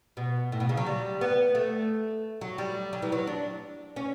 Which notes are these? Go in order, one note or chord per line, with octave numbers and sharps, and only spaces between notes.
B2
A2
B2
C#3
F#3
G3
B3
A3
F#3
G3
F#3
E3
F#3
D4
C#4